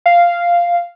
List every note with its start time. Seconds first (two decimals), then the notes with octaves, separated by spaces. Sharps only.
0.06 F5